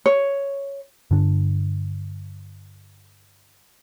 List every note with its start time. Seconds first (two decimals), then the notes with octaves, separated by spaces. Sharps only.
0.06 C#5
1.11 G2 D3 D4